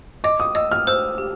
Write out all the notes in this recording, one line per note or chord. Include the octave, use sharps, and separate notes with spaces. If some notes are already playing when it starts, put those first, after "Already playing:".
D#5 D6
D#6
D#5 E6
F6
C5 E6
G4